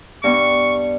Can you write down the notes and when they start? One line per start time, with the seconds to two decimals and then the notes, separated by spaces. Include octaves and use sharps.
0.24 G2 G3 B3 C#6